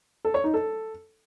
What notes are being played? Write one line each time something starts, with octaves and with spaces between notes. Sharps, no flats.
A4
C#5
D#4
A4